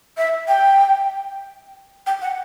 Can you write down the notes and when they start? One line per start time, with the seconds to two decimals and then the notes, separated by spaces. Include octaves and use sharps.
0.17 E5
0.48 G5
2.07 G5
2.22 F#5